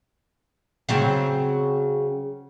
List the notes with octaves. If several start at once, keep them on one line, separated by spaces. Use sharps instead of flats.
C#3 F#3 C4